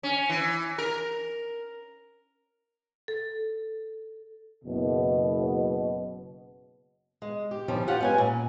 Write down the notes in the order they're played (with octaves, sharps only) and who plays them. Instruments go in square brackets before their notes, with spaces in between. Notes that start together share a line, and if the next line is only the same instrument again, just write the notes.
[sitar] C#4
E3
A#4
[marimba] A4
[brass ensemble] F#1 B2
[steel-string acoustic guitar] G#3
G4
D#3 F3 G3 C#4
F4 G4 F#5
G3 G#3 C#4 B4 G#5
A#2